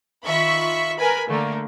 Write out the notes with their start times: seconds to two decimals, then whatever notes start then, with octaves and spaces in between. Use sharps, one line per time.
0.24 D#3 F4 E5 B5 C#6 B6
0.98 A#4 B4 G#5 B5
1.28 D3 A3 A#3